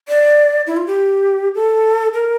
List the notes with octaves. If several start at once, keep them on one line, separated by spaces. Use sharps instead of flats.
D5
E4
F4
G4
A4
A#4